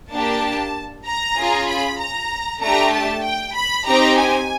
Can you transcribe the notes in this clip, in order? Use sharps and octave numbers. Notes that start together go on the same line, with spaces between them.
A#3 D4 G4 A5
A#5
C#4 F4 G#4
B5
A#5
A3 D4 G4 A#5
A5
G5
B5
C4 D#4 G4 A#5
G#5